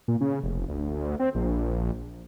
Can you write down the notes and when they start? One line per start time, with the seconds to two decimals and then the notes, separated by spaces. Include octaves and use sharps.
0.08 A#2
0.21 C#3
0.43 F1
0.68 D2
1.19 C4
1.35 A#1